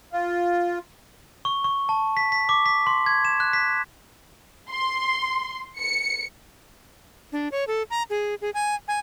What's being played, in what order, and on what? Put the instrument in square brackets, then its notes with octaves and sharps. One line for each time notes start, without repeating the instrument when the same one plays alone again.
[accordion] F4
[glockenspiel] C#6
C#6
A5
B6
B6
D6
B6
C6
G#6
E7
F#6
B6
[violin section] C6
C#7
[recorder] D4
C#5
A4
A#5
G#4
G#4
G#5
G#5